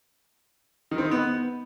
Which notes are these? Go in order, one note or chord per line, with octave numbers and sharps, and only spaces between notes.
D#3
C4
D#4
B3